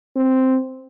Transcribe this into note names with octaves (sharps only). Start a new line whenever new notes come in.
C4